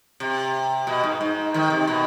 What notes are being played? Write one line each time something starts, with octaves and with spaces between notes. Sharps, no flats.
C3
B2
G#2
G#2
D#3
C3
B2